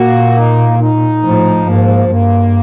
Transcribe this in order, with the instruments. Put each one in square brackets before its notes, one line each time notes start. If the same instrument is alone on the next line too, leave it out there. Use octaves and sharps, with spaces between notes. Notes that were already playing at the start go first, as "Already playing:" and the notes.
Already playing: [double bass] A#2 [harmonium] A#3 F#4
[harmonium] D#4
D#4
[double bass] A2 [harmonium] F3
[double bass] G#2 [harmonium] A#3
[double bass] G2 [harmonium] A#3